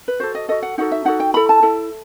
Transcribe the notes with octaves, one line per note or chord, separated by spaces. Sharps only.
B4
F#4 A4 C5
D#5
F#4 A4 D#5
F#5
D#4 F#4 A4 F#5
E5
D#4 F#4 A4 F#5
G5
E4 A4 B5
A5
E4 A4